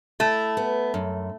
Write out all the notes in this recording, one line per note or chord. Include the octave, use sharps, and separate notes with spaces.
A3 E4
B3
F#2